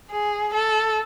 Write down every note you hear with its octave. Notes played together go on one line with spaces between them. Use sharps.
G#4
A4